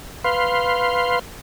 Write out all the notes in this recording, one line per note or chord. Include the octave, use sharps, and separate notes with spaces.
B4 F5 C6